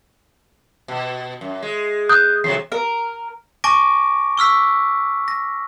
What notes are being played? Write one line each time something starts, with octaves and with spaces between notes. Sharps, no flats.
B2
F#2
G#3
D#6 F#6 G6
E2 C3 F#3 C7
A#4
G#5 A5 C#6 D6 A#6 D7
C#6 E6 F6 B6
A#6